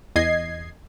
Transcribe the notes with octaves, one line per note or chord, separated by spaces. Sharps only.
E2 D#5 G#6 C7